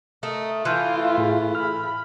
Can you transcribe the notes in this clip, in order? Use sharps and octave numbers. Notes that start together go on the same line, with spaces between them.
A3 A#4 D#5
E3 A3 E4 F4 A4 C6 F6 G6
A2 G#4
B5 F6